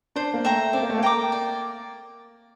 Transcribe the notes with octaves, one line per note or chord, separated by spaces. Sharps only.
D4 C5
A#3
A3 E5 G5 A#5
C4 D5
A#3
A3
A#3
G5 A#5 D6
D5